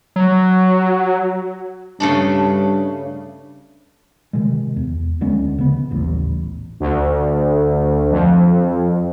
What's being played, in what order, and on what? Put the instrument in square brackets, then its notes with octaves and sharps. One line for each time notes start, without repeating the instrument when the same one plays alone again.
[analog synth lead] F#3
[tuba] G2 [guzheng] C#3 A3 D4
[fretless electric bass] C3 D#3 G#3
E2
D2 G#3 B3 C#4
C#3 B3
D#1 A1 D#2 A3
[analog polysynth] D2
F2